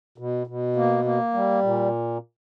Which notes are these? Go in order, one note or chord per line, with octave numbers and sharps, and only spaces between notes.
B2
B2
A#3
A#3
G3
A#2